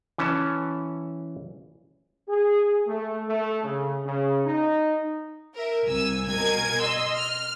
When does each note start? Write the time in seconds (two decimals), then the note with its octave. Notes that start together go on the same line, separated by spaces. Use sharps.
0.18 E3 C#4 A5
2.29 G#4
2.87 A3
3.28 A3
3.63 C#3
4.06 C#3
4.45 D#4
5.55 A#4 E5
5.85 C2 G#5 E6
6.28 B2 A#4 G#5 G#6
6.80 D#5 C6 E6
7.15 F6